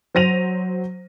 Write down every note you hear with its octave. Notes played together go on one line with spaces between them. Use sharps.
F#3 C5 A#6 D#7 F7